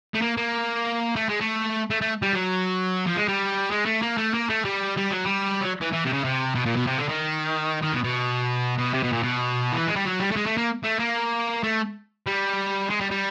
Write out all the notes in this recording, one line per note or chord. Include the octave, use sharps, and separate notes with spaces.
A3
A#3
A#3
A3
G#3
A3
A3
A3
G3
F#3
F3
G#3
G3
G#3
A3
A#3
A3
A#3
A3
G3
G3
F#3
G3
F#3
E3
E3
C3
C#3
C3
B2
A#2
B2
C3
D3
D#3
D#3
B2
B2
B2
C3
B2
A#2
B2
E3
G#3
G3
F#3
G3
A3
G#3
A3
A#3
A3
A#3
A3
G3
G#3
G3
G3